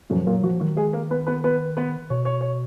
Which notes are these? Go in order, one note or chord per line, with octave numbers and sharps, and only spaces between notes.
F#2 F3 F#3
A#2 F#3 A#3
F3 F#3 F#4
D#3 F#3 F#4
G#3 G#4
A#3 A#4
B3 B4
B3 B4
B3 B4
B3 B4
B2 C#5
C#5
C#5